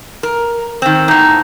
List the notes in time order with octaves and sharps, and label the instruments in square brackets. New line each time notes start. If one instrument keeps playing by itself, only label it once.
[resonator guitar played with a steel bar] A#4
D#3 C4
[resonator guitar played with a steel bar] E2 A2 [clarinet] D#4